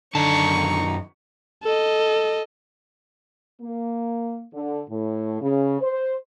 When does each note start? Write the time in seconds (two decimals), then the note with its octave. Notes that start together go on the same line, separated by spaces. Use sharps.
0.15 F#2 D3 D#3 D#4 A5 A#5 C#6
1.63 A4 D#5
3.60 A#3
4.52 D3
4.89 A2
5.41 C#3
5.81 C5